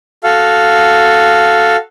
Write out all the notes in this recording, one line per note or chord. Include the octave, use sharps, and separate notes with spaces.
F#4 A4 F5